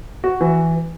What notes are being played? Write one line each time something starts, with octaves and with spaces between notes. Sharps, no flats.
F#4
E3